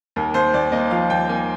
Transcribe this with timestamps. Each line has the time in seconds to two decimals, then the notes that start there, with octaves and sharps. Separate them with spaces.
0.16 D#2 A#4
0.34 D#2 C5
0.54 D#2 D5
0.72 A#3 D#5
0.91 F3 F5
1.10 D#2 G5
1.29 A#3 G#5